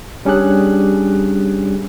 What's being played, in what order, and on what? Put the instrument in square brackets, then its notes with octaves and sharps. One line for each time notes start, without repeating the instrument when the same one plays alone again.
[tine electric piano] G3 C#4 D4 G4 G#4 F#6